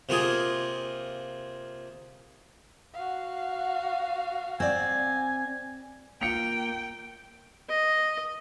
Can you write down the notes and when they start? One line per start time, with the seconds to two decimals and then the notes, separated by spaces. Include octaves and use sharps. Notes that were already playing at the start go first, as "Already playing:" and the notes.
0.09 C3 A#3 F4 G#4
2.94 F#4 F5
4.60 C4 D5 G#5
6.21 A#3 F4 G5 C#7 F7
7.70 D#5